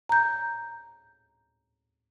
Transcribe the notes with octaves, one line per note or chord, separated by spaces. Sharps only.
A#5 G6